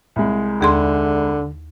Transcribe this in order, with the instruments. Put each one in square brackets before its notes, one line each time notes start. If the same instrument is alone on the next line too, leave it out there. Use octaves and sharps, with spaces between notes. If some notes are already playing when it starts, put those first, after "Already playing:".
[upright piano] C2 G#3
[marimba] D#2 G#4 C6 [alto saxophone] D3